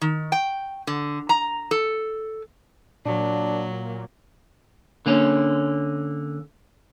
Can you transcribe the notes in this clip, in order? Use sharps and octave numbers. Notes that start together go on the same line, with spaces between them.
D#3
G5
D3
A#5
A4
A#2 F#3 D4
D3 A#3 C#4